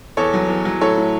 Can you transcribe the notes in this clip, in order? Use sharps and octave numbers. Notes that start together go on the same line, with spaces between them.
E2 A4 C#5
F#3
E2
F#3
A2 A4 C#5
A2